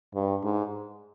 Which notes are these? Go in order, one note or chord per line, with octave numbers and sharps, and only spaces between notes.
G2
G#2